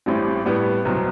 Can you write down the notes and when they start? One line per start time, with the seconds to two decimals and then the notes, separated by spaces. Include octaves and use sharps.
0.06 A1 A2 G3 C4
0.46 A2 G3 B3
0.85 C2 B2 F#3 C4